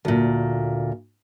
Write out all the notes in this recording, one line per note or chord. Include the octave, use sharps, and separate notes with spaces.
D2 A#2